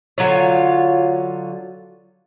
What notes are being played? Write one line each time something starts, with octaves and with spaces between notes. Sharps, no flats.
D3 F#3 F4 C#5